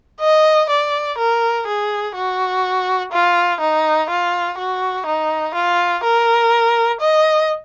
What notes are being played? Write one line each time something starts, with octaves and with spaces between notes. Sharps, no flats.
D#5
D5
A#4
G#4
F#4
F4
D#4
F4
F#4
D#4
F4
A#4
D#5